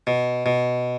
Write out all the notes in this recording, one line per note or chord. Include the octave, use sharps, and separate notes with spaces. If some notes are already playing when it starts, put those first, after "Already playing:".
B2
B2